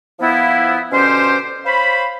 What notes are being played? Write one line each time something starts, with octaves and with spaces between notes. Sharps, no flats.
F3 B3 E4
B2 D3 C#4 G4 C5
C5 C#5 F5 B5